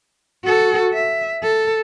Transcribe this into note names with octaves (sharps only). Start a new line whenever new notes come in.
F#4 A4
E5
A4